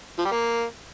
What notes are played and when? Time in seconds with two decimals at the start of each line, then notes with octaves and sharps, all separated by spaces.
0.19 F3
0.25 G3
0.32 A#3